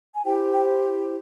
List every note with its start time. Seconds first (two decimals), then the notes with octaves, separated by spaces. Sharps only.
0.14 G#5
0.23 E4 G4 C5 G5
0.52 G5